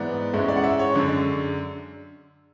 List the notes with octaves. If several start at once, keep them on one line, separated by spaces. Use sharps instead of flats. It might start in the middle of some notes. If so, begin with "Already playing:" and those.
Already playing: G#2 E3 B3 D5
G#2 G#3 C#4 E4
D5
F#5
E5
C#5
F#2 D3 G#3 D4